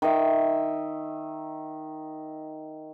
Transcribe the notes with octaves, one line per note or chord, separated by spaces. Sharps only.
D#3 D#5 E5